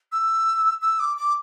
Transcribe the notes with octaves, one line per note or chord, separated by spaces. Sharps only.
E6
E6
D6
D6